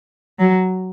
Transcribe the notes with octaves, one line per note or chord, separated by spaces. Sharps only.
F#3